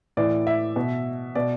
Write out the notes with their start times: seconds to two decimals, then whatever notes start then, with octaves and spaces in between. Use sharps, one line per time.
0.17 A2 E3 D5
0.47 E5
0.76 B2
1.35 B2 D5